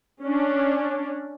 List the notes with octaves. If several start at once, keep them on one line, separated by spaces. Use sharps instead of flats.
C#4 D4